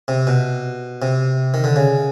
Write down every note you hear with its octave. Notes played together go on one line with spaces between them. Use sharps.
C3
B2
C3
D#3
D3
C#3